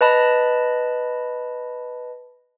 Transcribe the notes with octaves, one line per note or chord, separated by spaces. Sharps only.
B4 D#5 A5 B5